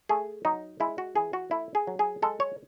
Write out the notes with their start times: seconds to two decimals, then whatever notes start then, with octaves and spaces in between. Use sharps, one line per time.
0.09 A3 G#4
0.45 F#3 D#4
0.80 G#3 E4
0.98 F#4
1.16 E3 G#4
1.33 F#4
1.51 A3 E4
1.75 G#4
1.87 F#3
1.99 G#4
2.22 G#3 A4
2.40 C#5